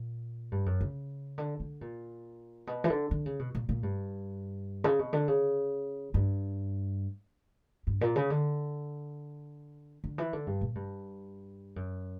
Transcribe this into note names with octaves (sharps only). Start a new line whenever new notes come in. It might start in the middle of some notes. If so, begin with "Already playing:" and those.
Already playing: A#2
G2
F#2
C#3
D3
D3
A#2
B2
E3
D3
D3
C#3
B2
A#2
A#2
G2
C#3
B2
D3
C#3
G2
G2
A#2
C#3
D3
D3
E3
D3
G2
A#2
G2
F#2